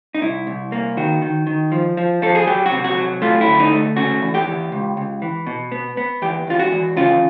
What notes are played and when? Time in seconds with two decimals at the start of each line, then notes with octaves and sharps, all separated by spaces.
0.15 D#4
0.22 C2 E4
0.47 C2
0.72 A#3
0.97 D#3 F#4
1.22 D#3
1.47 D#3
1.72 F3
1.97 F3
2.22 F3 A4
2.35 G#4
2.47 F#3 G4
2.66 F#4
2.72 C3
2.84 F#4
2.97 F#3
3.22 A3 F4
3.41 E4
3.47 D2
3.60 D#4
3.72 A3
3.97 C#3 F#4
4.22 E2
4.34 G4
4.47 E2
4.72 C#2
4.97 C#2
5.22 E3
5.47 B2
5.72 B3
5.97 B3
6.22 E2 G4
6.47 E2 F4
6.59 F#4
6.72 E2
6.97 C#3 F4